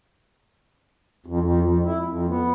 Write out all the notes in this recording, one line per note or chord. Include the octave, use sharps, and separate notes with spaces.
F2
F2
F2
E4
F2
B3